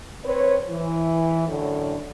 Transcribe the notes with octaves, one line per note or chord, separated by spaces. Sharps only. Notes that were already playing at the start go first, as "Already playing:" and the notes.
C4 B4 C#5
E3
F#2 A2 D3